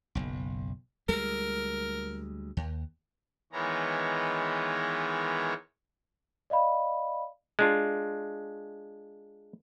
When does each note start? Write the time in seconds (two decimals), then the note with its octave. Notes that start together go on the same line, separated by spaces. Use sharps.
0.15 F#1 B1
1.09 D2 G3 G#3 A#4
2.57 D#2
3.53 D#3 E3 G#3 B3 C#5 A#5
6.50 D5 D#5 F5 B5
7.59 G#3 D4 F4